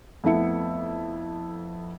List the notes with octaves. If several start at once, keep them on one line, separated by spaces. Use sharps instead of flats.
F2 A3 B3 E4 E5 C#7